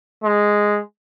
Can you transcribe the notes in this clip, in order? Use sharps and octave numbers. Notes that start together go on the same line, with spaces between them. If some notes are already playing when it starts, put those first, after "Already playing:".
G#3